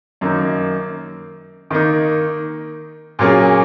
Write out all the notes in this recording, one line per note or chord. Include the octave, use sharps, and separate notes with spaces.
F#2 D#3 A#3 D#4
D#3 A#3 D#4
A#2 F#3 A#3 C#4 G#4